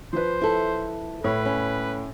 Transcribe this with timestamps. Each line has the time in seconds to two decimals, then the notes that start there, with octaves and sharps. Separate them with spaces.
0.13 F3 B4 C5
0.41 E4 A4
1.24 A2 B4 C#5
1.45 C#4